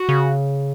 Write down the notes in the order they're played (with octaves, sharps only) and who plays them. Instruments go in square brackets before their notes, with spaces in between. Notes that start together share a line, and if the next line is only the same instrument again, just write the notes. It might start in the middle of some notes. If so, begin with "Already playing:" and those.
Already playing: [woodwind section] F#4
[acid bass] C#3